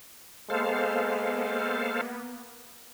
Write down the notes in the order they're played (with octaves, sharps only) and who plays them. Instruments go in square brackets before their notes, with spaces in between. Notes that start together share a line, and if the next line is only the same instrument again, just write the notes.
[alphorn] G#3 [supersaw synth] A#3 B3 [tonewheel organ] A4 C5 F5